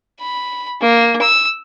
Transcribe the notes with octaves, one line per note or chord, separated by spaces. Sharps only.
B5
A#3
E6